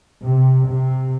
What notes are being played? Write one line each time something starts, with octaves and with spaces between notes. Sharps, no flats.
C3
C3